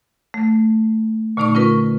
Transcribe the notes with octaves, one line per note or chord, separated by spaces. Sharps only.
A3
A#2 D3 A3 D#4 D5 C#6
C#4 F4 A#4 B4